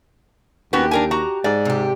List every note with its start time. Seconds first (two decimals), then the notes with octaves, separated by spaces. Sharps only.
0.73 D#2 B3 C#4 F#4 G4
0.91 D4 A#4 G#5
1.11 F#4 A#5
1.44 G#2 D5
1.65 C3 G4